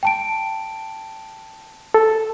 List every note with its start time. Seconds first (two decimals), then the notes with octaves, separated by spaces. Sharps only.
0.03 G5 A5 D7
1.94 A4